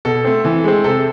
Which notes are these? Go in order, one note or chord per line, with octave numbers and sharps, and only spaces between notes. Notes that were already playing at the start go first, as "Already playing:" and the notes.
B2 A4
A3 C4
E3
G#3 C4
C3 A4